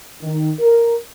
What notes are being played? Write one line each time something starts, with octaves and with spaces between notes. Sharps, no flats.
D#3
A#4